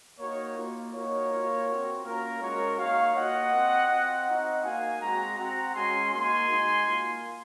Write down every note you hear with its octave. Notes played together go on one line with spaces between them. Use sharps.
A#3 D#4 F#4 A#4 C#5
A#3 F4
A#3 D#4 F#4 A#4 C#5
A#3 F4
C4 F#4
A#3 C#4 F4 A#4
G#3 C#4 F#4 A#4 C#5
A#3 D#4 F#4 C#5 F5
A#3 F4 D#5 F#5
C4 F#4
C4 F4
C4 D#4 F#4 D#5 F#5
A#3 D#4 F#4 F5 G#5
G#3 C4 F#4 F#5 A#5
C4 F#4 F#5 A#5
G#3 C#4 F#4 G#5 C6
A#3 D#4 F#4 G#5 C6
G#3 D#4 F#4
A#3 F4